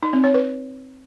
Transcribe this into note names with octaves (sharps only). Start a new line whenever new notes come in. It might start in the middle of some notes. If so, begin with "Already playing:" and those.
D#4
C4
C#5
B4